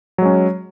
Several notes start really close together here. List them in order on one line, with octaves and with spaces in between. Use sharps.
F#3 G#3 C#4